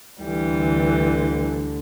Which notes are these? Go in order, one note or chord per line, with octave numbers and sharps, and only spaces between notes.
D2 D3 E3 G3